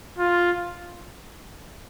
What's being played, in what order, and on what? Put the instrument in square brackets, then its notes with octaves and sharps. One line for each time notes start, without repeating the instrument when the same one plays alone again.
[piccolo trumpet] F4